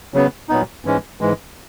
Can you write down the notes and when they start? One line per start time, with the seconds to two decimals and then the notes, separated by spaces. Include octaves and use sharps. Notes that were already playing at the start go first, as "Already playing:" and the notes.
0.14 C#3 F#3 B3
0.49 A#2 F#3 B3 D#4
0.85 G#2 E3 G#3 C#4
1.21 G#2 E3 G#3